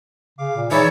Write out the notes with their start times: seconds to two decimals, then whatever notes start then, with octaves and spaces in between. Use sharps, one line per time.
0.39 C#3 F5 D6
0.56 A#2
0.71 E3 G#3 D#4 E4 C#5 D5 E6